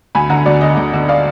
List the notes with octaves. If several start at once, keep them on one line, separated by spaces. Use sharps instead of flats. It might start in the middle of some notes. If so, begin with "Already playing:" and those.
D2 G#5 B5
D3 F#5 A#5
D2 D5
D3 D#5
D2
D3
D5 F5